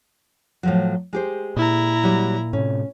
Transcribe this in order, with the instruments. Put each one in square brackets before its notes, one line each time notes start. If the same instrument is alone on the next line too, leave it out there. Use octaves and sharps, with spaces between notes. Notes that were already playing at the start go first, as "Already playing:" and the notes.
[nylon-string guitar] A2 F3 F#3
G#3 G4 C5
[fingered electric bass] A#2 [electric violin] E4 A#5
[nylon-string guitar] F#3 G3
[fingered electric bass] A2 C3 [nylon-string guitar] C#4